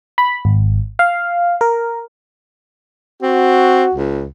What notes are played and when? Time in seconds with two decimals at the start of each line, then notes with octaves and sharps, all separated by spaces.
0.18 B5
0.45 G#1
0.99 F5
1.61 A#4
3.22 C4 F#4
3.94 C#2